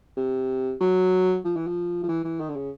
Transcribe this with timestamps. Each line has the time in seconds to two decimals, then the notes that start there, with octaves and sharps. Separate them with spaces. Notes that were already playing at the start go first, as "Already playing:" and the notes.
0.17 C3
0.81 F#3
1.45 F3
1.56 E3
1.67 F3
2.03 F3
2.08 E3
2.24 E3
2.40 D#3
2.49 D3
2.56 C#3